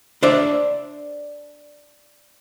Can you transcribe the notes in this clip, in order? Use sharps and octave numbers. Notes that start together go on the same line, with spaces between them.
D4 C5 D5 E5